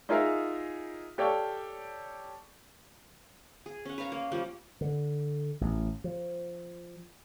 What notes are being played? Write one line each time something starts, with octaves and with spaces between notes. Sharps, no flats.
D#4 F4 G#4 A#4 E5 F5
G4 A4 C#5 D5 F5 G5
G#4
C#4 F#5
B4 C#5 F5 A#5
A#3
F3 G3 A#3
D3
A1
F3